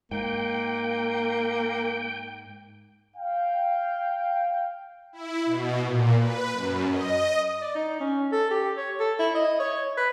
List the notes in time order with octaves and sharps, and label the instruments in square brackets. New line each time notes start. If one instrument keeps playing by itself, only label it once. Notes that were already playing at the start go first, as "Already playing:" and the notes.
[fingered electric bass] G#2 [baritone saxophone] A#3 [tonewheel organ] G5
[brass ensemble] F5 G5
[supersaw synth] E4
B2
A#2
B4
F#2
D#5
[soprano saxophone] D5
D#4
C#4
A4
G4
C#5
A4
E4
D#5
C#5
B4